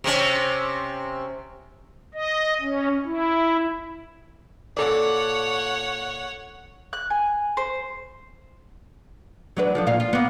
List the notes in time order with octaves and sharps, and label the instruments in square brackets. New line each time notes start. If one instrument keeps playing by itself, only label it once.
[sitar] C3 C4 C#4
[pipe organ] D#5
C#4
E4
[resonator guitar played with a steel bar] A#2 A4 D5 [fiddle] C#5 F#5
[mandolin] F#6
G#5
C5
[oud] F#3 D4 B4
F3 A3 D4
A#2 F4 F5
F4
A#3 B3